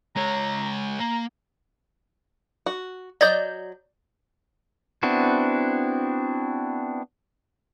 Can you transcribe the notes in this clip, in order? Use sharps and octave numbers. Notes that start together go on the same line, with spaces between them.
G#3 C#5 A#5
A#3 A#5
F#4
F#3 D5 D#5 G6
B3 C4 D4 E4 F#4